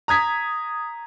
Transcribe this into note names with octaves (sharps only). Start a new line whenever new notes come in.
A#5 D#6 G#6 B6